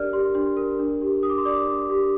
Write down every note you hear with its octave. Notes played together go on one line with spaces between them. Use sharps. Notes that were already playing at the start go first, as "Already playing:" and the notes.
Already playing: D4 G4 A#4 D5 F6
G4 C6
D4 C6
A#4
D4
G4
D4 D#6
D6
C6
D5 D6
D4
G4